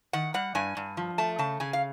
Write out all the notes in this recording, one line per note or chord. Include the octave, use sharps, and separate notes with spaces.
D#3 F#5
G3 F#5
G2 G#5
G2
F3
A3 A5
C#3 A5
C#3 G#5
F5